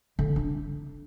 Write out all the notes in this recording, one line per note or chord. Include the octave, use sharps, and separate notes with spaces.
D3
D4